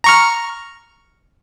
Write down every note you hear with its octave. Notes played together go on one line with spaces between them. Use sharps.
A#5 C#6 F6